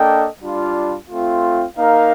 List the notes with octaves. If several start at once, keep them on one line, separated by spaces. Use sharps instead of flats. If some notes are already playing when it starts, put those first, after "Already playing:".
Already playing: A#3 D4 A4 D#5 G5
G3 D4 F4
A3 C4 F4
A#3 D#4 A#4 F5